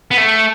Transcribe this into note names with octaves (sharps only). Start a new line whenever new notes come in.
B3
A3